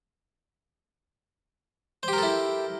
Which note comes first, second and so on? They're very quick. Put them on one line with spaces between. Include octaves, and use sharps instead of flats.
C5 G4 A#4 A4 E4